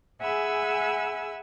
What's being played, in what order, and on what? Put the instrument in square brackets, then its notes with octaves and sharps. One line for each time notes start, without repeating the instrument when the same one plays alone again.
[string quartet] G#4 E5 F#5 G#5 B5 E6